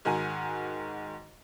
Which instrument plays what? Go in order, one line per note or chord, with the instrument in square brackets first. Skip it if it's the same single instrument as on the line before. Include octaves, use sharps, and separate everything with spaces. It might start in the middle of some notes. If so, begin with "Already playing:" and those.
[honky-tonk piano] G#2 D#3 F#4 G#5